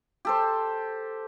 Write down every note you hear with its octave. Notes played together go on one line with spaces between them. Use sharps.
G4 A4 C5